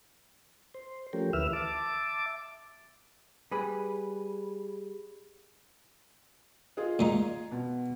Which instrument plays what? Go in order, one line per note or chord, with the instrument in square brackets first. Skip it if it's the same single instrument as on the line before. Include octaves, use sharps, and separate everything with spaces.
[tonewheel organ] C5
F3 A3 C#4 G4 A#4
D2 E3 B4 E5 E6 F6
E5 A5 D6
[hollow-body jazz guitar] G3 G#4 B4
[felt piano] F4 G#4 D#5
[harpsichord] A#2 G#3 D#4
[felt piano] B2